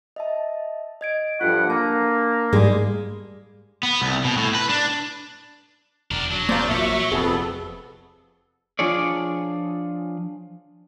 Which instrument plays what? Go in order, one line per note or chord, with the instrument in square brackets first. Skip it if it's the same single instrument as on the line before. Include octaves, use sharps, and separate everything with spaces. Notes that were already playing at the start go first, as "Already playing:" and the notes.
[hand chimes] D#5 E5 A5
D#5 G#6 D7
[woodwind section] G2 F3 F#5 [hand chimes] F4 A4
[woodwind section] A#3 [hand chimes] D4 A5 A#5
[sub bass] G#2 [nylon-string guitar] G3 G#3
[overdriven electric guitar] B3
C2
B2
A2
B4
D4
[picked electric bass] E1 [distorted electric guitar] D4 A#4
[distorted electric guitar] F#3
[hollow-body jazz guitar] A#3 F5 [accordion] C5 D5 A5
[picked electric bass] A#1 C#3 F3 [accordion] E5 C#6
[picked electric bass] F1 C3 [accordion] F2 B3 A4 [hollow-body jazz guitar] G#4
[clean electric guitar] F3 D4 F4 G#4 C#5 D5